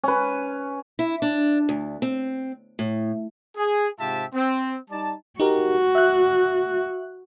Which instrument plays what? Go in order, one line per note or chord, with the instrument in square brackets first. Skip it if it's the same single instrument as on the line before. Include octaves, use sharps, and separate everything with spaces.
[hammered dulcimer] C#4 B4
[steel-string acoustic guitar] E4
D4
D2
C4
A2
[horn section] G#4
G#2 C3 F4 G4 E5 A5
C4
G3 D#4 D5 A5
[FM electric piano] D#4 G4 A#4 [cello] F#4
[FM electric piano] E5 F#6